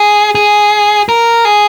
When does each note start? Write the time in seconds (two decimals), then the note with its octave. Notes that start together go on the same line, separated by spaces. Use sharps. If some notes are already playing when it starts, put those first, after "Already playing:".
Already playing: G#4
0.35 G#4
1.09 A#4
1.45 G#4